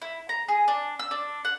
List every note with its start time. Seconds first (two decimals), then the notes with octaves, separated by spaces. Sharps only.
0.02 E4
0.29 A#5
0.48 G#4
0.68 D4
0.99 E6
1.11 D4
1.45 F#5